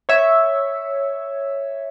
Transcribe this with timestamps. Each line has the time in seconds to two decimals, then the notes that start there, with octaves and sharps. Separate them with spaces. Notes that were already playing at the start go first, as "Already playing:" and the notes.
0.09 C#5 E5